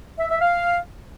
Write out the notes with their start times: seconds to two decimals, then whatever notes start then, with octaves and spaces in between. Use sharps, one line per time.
0.19 E5
0.29 E5
0.40 F5